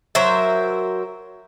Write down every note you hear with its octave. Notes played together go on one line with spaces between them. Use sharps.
F#3 A#4 C5 E5